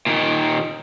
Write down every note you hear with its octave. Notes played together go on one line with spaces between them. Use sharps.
A#2 D#3